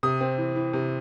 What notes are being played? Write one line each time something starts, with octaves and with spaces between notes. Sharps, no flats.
C3 D#6
C4
E3
E3
C3